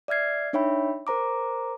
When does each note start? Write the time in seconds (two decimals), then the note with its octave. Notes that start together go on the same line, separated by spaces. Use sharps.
0.08 D5 E5 F6 G#6 C7
0.53 D4 D#4 C#5 E5 G5 B5
1.07 A#4 C5 A#5 D6